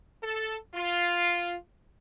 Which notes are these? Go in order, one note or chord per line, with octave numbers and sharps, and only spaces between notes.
A4
F4